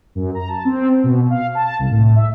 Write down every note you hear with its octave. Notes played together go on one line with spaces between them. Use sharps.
F#2
A#5
A5
C4
B2
F5
A5
C2
A2
E5